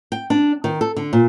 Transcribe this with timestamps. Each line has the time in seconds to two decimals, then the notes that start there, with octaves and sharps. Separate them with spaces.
0.12 G5
0.30 D4
0.64 D#3
0.81 A4
0.96 D3
1.13 A#2